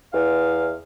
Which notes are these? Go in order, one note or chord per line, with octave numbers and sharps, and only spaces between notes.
E2 F5